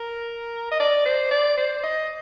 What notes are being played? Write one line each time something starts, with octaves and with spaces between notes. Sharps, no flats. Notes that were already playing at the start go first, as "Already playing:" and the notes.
Already playing: A#4
D#5
D5
C5
D5
C5
D#5